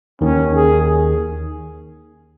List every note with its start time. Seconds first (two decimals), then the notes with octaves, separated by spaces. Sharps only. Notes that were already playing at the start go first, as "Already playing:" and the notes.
0.21 D#2 D#3 C#4
0.55 G#4